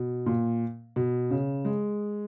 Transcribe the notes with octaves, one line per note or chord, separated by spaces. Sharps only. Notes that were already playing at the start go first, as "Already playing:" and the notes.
Already playing: B2
A#2
B2
C#3
G#3